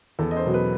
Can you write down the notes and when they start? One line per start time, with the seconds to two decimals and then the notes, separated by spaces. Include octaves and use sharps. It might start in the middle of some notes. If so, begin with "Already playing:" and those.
0.19 E2 A4
0.31 D#5
0.36 C5
0.46 B2 F#3
0.54 B4